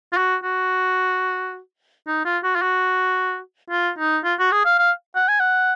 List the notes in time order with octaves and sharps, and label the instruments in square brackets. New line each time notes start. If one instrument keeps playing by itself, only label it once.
[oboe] F4
F#4
F#4
D#4
F4
F#4
F4
F#4
F4
D#4
F4
F#4
G#4
F5
F5
F#5
G#5
F#5